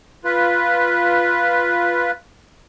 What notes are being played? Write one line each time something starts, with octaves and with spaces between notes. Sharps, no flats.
F4 B4